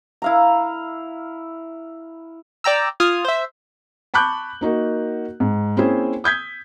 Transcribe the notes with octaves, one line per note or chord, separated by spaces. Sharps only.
E4 F5 A#5
D5 G5 A#5 E6
F4 D#6 F6 G#6
C5 E5
A5 B5 C#6 D6 F#6 G6
A#3 D#4 F#4 A#4
G#2
A#3 C4 C#4 E4 G#4 C5
D#6 G6 G#6 B6